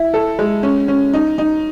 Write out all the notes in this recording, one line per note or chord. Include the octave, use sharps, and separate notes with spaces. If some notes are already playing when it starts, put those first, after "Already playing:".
Already playing: E4
A4
G#3
C#4
C#4
D#4
D#4